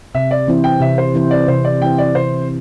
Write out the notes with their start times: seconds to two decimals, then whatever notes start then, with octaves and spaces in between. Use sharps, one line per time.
0.15 C3 E5
0.31 D5
0.48 E3 C4 E4 C5
0.64 G5
0.81 C3 E5
0.98 C5
1.14 E3 C4 E4 C5
1.31 D5
1.48 C3 C5
1.65 D5
1.82 E3 C4 E4 C5 G5
1.98 D5
2.15 C3 C5